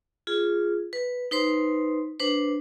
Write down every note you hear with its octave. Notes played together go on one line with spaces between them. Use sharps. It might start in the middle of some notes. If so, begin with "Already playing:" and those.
F4 G#4
B4
D#4 B4 C5 C6
D4 B4 C5